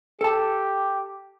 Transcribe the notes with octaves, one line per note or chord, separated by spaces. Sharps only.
G4 A4 A5